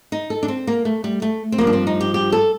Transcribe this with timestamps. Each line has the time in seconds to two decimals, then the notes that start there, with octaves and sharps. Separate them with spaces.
0.12 D#4
0.30 A4
0.43 D4
0.48 C4
0.67 A#3
0.85 A3
1.04 G3
1.22 A3
1.52 C4
1.58 G2 F3 A#3
1.67 D4
1.73 C4
1.87 D#4
2.01 G4
2.14 G4
2.32 A4